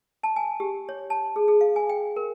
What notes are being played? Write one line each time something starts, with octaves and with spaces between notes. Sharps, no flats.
A5
G#5
G4
C#5
A5
G#4
G#4
F5
G#5
G5
A#4